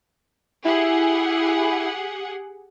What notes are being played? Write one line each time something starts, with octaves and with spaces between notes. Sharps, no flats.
E4 G4 G#4 F#5